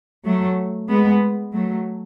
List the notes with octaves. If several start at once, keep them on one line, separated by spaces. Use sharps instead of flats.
F#3 A3
G#3 B3
F#3 A3